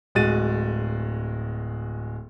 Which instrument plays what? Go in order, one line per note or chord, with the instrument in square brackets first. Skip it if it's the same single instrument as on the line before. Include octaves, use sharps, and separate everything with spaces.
[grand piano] D1 G#3 F#4 A6 D#7